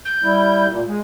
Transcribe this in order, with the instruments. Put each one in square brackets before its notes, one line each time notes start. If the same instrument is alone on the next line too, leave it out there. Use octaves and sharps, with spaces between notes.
[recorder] G6
[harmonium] G3 E4
A#2
G#3